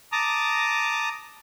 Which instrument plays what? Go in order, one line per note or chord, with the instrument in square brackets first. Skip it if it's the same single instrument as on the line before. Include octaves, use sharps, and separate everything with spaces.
[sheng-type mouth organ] A5 A#5 D6 D#6